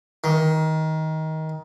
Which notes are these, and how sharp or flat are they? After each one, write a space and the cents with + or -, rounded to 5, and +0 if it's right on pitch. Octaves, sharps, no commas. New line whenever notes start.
D#3 +20